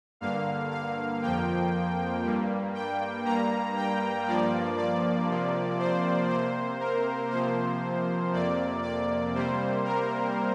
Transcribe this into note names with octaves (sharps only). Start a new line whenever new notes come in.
G2 D3 A#3 F5
F5
F2 F3 A#3 G5
G2 G3 A#3
G5
G2 G3 A#3 A#5
G5
G2 F3 A#3 D5
D5
C3 F3 A#3
C5
C3 A#3 C5
A#4
C3 F3 A#3 C5
F2 C3 A#3 D5
D5
C3 G3 A#3 C5
A#4